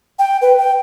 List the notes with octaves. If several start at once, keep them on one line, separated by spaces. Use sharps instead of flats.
G5
B4
G5